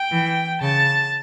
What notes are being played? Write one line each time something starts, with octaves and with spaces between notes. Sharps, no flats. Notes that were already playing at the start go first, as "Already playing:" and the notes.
Already playing: G5
E3
C#3 A5